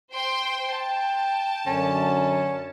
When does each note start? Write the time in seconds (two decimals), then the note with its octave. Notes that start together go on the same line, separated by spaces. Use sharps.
0.13 C5 G5 C6
0.73 G5 A5
1.67 F#2 D3 C#4